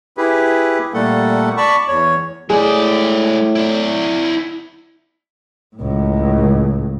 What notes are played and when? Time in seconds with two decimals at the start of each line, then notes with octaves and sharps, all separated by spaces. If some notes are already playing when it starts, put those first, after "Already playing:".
0.17 E4 G4 G#4 B4
0.94 A#2 G3 A3 A#3 A4 F#5
1.57 D5 A5 B5 C#6
1.88 E2 C#5
2.50 A2 G#3 G#4 D5
3.56 E4 D5
5.77 C#2 A2